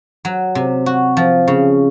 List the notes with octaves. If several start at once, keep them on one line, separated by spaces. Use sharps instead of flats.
F#3
C3
F#4
F3
C#3